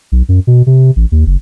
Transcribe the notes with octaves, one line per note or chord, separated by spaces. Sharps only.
B1
F#2
B2
C3
A1
D#2
F#1